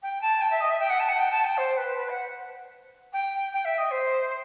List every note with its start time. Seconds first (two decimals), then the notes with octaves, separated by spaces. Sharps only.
0.02 G5
0.21 A5
0.41 G5
0.50 E5
0.60 D#5
0.70 E5
0.79 G5
0.89 F#5
0.99 A5
1.08 F#5
1.18 G5
1.31 A5
1.44 G5
1.57 C5
1.77 B4
1.96 B4
2.09 F#5
3.12 G5
3.52 G5
3.64 E5
3.78 D#5
3.91 C5